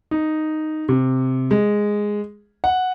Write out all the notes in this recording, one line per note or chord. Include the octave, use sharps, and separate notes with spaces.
D#4
C3
G#3
F#5